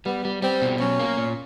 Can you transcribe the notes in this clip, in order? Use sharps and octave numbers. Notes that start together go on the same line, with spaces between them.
G3 B3
G3
G3 C4
B2
F#3 C#4
A#3
A#2